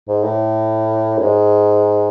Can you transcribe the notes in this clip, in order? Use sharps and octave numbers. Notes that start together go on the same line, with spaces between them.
G#2
A2
F#2
G#2